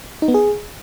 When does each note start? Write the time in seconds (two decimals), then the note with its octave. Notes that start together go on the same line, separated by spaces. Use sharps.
0.22 D#4
0.28 B3
0.34 G#4